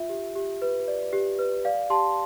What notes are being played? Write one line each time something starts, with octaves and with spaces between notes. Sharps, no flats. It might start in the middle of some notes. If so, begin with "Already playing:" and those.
Already playing: F4 E5
G4
G4
B4
D5
G4
B4
D5 F5
G4 A5 C6